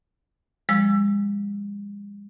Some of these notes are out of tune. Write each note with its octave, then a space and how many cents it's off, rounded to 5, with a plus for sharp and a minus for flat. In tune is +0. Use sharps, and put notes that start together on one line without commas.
F3 +0 G#3 -40 E6 +25